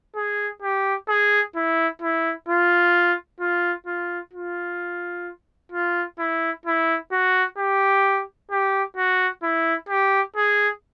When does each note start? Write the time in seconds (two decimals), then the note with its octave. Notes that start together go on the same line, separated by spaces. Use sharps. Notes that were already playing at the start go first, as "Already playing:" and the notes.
0.16 G#4
0.62 G4
1.09 G#4
1.56 E4
2.02 E4
2.49 F4
3.40 F4
3.87 F4
4.34 F4
5.72 F4
6.19 E4
6.66 E4
7.12 F#4
7.58 G4
8.51 G4
8.97 F#4
9.43 E4
9.89 G4
10.36 G#4